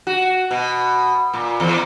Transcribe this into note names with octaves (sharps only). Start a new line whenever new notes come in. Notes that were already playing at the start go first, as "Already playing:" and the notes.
F#4
B2
A#2
E2